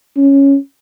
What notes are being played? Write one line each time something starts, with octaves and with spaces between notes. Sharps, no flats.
C#4